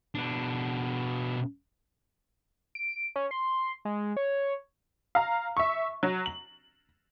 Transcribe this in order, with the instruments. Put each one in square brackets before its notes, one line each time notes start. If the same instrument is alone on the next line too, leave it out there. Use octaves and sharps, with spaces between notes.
[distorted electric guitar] B2 D4
[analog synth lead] D7
C#4
C6
G#3
C#5
[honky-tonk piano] F5 A#5
E5 C#6
F#3
F#7